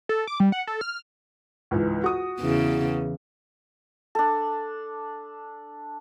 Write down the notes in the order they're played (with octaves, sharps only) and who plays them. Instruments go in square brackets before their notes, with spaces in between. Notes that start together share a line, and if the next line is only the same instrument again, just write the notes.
[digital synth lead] A4
D6
G3
F#5
A4
F6
[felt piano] C#2 G#2 E3
F#4 D#6
[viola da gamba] E2 C#3 E3
[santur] D4 A4